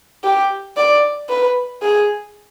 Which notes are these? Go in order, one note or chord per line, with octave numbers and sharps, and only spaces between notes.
G4
D5
B4
G#4